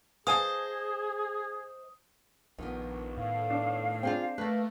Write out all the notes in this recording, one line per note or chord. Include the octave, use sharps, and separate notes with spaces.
G#4 C5 D#5 F5 G#5 A5 D#6
A#1 D#3 B3
A2 F5
A2 D4
C4 D4 F4 G#4 G5
A3 A#3 B4 F#6